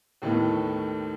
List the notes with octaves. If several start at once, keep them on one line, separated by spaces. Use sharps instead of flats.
D#2 A2 D#3 A3 B3